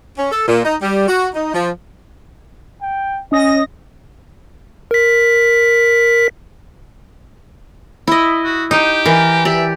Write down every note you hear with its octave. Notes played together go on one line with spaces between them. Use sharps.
C#4
A4
A#2
D#4
G3
F#4
D#4
F3
G5
C#4 D#5 D#6 A#6
A#4 B6
E4 D#5
F#4
D#4 G4
E3 A#4
G4 D5 E5